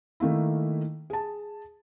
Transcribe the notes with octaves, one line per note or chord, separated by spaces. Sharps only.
D#3 A3 A#3 E4
G#4 A5